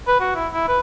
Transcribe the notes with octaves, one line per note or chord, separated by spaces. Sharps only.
B4
F#4
E4
E4
B4